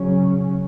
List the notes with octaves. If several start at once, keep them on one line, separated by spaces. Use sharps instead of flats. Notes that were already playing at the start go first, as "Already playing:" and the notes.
Already playing: C#3 F#3 C#4